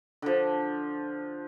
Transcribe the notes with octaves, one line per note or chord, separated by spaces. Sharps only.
D3 F3